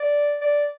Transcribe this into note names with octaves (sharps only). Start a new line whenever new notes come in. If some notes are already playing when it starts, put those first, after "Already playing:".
Already playing: D5
D5